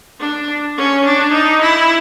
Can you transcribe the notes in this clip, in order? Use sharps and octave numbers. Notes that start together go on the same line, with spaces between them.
D4
C#4
D4
D#4
E4